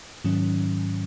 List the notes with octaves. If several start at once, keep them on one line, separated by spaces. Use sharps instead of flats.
G#2 D#3 F#3 C#4